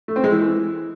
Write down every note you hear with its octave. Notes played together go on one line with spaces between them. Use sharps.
A3
C4
G#3
E3